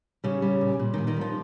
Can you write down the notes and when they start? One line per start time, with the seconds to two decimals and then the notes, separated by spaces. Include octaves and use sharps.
0.24 C#3 G3 C#4
0.42 G3
0.61 A#2
0.79 A#2
0.94 D#3 D#4
0.98 A#2
1.07 D#3 D#4
1.17 F3 G3 F4